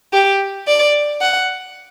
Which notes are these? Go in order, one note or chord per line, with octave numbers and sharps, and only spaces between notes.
G4
D5
F#5